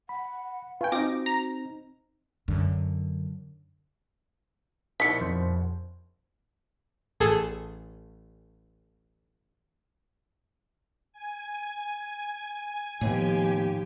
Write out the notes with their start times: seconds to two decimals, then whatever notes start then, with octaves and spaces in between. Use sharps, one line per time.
0.09 F#5 B5
0.81 F4 B4 G5 G#5 C#6
0.92 C4 D#4 F4 F#4 D6 A#6
1.26 A#5
2.48 F#2 D3
5.00 A#1 B2 D#4 E4 B6 C#7
5.21 F2 C5
7.20 A1 G#4 A4
11.13 G#5
13.01 D#2 A2 F3 B3 G4